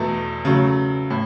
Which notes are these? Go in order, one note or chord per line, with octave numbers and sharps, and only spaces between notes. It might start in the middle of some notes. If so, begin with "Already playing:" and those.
Already playing: E2 B2 A3
C#3 F#3 A3
A2